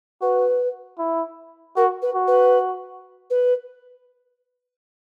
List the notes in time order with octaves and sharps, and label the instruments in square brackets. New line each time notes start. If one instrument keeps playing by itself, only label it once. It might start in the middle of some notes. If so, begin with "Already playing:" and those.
[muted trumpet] F#4 [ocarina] B4
[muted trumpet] E4
[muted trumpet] F#4 [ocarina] A#4
[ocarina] B4
[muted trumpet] F#4
[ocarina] B4
B4